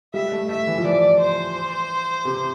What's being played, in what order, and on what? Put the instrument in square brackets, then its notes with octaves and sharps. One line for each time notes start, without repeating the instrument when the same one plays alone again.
[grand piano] G3 [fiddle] E5
[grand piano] A3
[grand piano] A3 [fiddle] E5
[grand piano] E3
F3
[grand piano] E3 [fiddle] D5
[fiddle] C5
[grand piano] C3